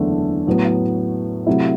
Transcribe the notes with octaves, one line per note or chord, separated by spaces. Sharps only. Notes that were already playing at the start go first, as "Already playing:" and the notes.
Already playing: F#1 E2 D3 A3 E4
A2 F#3 B3
C3 F#3 A3 E4